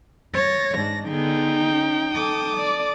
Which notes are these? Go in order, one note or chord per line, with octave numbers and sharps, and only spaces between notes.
C#5 A6 A#6
G#2 D4 A#6
D3 B3 D#4 G#4 G5
C#4
A4 D6 D#6
D5